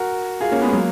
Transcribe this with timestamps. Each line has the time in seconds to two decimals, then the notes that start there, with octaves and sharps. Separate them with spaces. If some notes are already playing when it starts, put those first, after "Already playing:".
Already playing: F#4 A#4
0.41 F4 G#4
0.52 A#3 C#4
0.61 G#3 B3
0.73 F#3 A#3